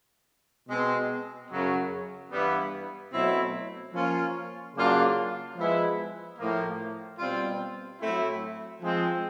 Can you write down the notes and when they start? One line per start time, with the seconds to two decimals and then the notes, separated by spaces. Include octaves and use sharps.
0.69 B2 G#3 C4
1.50 F#2 C#3 F#3
2.31 G2 E3 G3 B3
3.12 B2 F#3 A3 C4 E4
3.94 F3 A#3 C#4 F4
4.75 C#3 F#3 A#3 D4 F4
5.57 F3 G#3 B3 E4
6.38 A2 F3 A#3
7.19 B2 G3 C4 F4
8.00 A2 F#3 A3 C4 E4
8.81 F3 G#3 C4